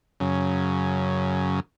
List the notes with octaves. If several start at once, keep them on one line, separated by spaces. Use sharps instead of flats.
F#2 C#3